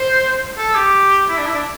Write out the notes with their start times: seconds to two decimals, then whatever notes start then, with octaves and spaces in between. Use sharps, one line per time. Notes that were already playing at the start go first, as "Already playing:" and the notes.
Already playing: C5
0.58 A4
0.75 G4
1.29 E4
1.38 D4
1.46 E4
1.54 D4